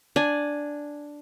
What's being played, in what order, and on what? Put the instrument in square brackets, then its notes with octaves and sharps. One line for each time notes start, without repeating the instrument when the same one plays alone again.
[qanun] D4 G#5